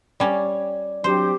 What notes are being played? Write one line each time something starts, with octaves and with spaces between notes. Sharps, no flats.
G3 C#4 D5
F#3 C4 D4 G4 C5